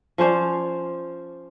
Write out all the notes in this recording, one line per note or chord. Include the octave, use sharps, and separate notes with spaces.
F3 C#4 C5 D5